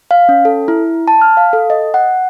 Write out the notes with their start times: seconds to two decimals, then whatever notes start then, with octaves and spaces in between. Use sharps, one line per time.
0.11 F5
0.29 C#4
0.45 A4
0.68 E4
1.08 A5
1.22 F6
1.37 F5
1.53 A4
1.70 D#5
1.94 F#5